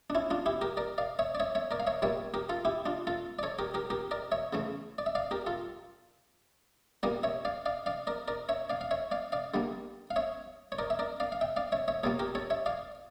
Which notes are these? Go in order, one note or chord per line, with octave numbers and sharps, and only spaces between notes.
D4
C#4 E4
D4 F4
E4 G4
G4 A#4
A#4 D5
D5 F5
C#5 E5
D5
C#5 E5
C#5 E5
A#4 D5
F5
C#5 E5
A#2 G3 A#3 C#5 E5
G4 A#4
F4 A4
E4 G4
D4 F4
F4 A4
D5
A4 C#5
G4 A#4
G4 A#4
G4 A#4
A#4 D5
C#5 E5
C#3 E3 A3
D5
E5
D5 F5
G4 A#4
F4 A4
A#2 G3 A#3 A#4 D5
C#5 E5
D5 F5
D5 F5
D5 F5
A#4 D5
A#4 D5
C#5 E5
D5 F5
F5
C#5 E5
D5 F5
D5 F5
D3 G3 A#3
F5
C#5 E5
C#5
A#4 D5
E5
A#4 D5
D5 F5
F5
E5 G5
D5 F5
C#5 E5
C#5 E5
A#2 G3 A#3 A4 C#5
G4 A#4
A4 C#5
C#5 E5
D5 F5